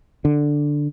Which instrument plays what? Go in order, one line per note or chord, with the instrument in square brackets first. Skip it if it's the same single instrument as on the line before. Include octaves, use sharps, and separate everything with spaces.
[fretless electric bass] D3